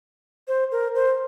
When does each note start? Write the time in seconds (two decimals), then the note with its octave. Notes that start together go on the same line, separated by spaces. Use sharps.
0.48 C5
0.72 A#4
0.95 C5